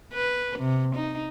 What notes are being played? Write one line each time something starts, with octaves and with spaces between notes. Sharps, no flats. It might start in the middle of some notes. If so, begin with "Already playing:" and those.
B4
C3
D#4